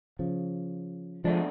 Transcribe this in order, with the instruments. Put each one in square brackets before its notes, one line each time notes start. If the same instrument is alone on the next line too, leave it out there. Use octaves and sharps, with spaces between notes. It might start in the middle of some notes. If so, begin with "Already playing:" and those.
[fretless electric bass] C#3 F3
[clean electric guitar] B2 A3 D4 [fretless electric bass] F3 G#3